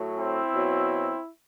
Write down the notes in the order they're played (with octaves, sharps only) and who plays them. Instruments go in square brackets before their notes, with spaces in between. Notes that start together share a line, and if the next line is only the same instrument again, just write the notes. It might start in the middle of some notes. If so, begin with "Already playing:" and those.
Already playing: [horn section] A2 F#3
C4 E4
B2 F#3